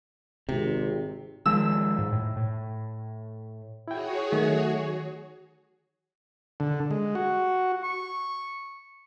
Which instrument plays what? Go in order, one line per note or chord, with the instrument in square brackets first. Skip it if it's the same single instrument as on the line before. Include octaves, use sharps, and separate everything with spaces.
[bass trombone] G#1 [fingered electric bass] C3
[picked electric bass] D#3 F3 G#3 [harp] E6
[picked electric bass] G#2
A2
A2
[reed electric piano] E4 G5 [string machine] F#4 G#4 C#5
[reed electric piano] D#3 F#3 [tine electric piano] A3
[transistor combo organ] D3
G#3
F#4
[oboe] C#6